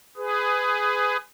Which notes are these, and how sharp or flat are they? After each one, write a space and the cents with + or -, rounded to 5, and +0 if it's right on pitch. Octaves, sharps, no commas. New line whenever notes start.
G#4 +0 B4 +25